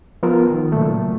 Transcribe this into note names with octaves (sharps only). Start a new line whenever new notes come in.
F3 B3 F4 A#4
D#3
A#2 C#3 F#3 A3